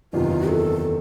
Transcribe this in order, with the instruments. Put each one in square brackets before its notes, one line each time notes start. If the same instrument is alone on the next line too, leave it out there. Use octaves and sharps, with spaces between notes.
[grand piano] F#1 E2 C3 D#3 [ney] F4
[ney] A4